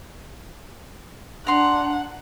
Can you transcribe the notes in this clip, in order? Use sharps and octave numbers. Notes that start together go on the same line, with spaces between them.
D4 F#5 A#5 C6